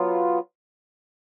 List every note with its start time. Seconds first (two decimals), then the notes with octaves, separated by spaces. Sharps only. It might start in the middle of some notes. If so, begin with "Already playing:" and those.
Already playing: F#3 B3 F4